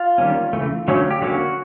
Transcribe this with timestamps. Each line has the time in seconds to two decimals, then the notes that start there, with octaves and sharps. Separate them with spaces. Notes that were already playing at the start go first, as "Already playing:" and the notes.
Already playing: F4
0.18 D#3 G3 A#3 C#4
0.53 C#3 E3 A3
0.88 D3 F#3 A3 C#4
1.11 G4
1.21 D3 F#3 A#3 C#4 F#4